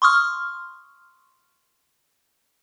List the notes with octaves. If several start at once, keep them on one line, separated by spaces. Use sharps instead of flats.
C6 C#6 D#6 F6